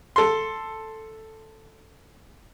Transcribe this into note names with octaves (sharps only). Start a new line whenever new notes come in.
A4 C6